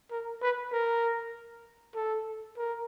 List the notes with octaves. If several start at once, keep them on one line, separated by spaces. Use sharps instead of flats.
A#4
B4
A#4
A4
A#4